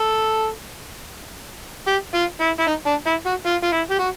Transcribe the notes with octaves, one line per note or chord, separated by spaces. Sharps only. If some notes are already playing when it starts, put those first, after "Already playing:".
Already playing: A4
G4
F4
E4
E4
D#4
D4
E4
F#4
F4
F4
E4
G4
F#4